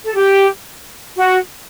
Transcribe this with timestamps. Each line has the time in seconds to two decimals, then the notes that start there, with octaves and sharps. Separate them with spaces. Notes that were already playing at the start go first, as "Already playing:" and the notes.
0.05 A4
0.16 G4
1.17 F#4